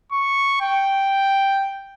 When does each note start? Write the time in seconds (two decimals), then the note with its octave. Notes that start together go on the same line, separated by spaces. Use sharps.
0.12 C#6
0.61 G5